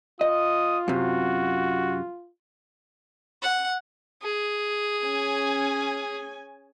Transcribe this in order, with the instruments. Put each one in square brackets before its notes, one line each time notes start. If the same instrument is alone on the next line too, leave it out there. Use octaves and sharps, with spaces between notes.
[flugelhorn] F4 [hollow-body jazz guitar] D#5 [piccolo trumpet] D#6
[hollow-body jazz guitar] F#2 C3 [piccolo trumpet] F#4
[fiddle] F#5
G#4
[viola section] C#4 G#5